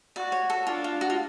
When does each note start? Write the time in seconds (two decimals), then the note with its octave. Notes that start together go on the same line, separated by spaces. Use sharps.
0.16 F#4 D5
0.32 C#5
0.50 A4
0.67 D4 F4
0.84 F4
1.01 F#4
1.10 F4